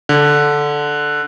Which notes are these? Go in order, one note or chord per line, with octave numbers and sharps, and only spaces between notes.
D3